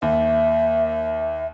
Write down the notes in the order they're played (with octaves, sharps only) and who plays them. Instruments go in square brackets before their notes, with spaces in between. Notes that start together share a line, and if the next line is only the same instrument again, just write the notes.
[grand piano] D#2 [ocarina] E5